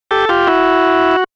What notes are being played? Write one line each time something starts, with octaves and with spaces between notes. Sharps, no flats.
G4 A4
F4 G4
E4 F#4